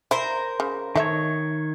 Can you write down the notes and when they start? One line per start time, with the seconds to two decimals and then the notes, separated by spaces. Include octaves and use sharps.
0.11 E4 A#4 C5
0.60 C#3
0.96 D#3 A3 C#5 E5